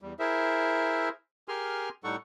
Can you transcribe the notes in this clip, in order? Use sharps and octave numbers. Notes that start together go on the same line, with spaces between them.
E2 G3
E4 G#4 A#4 C5 E5
G4 G#4 A#4 G#5 C6 F6
A2 G3 D#4 A4 F#5 C#6